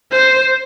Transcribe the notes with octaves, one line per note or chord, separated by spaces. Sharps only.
C5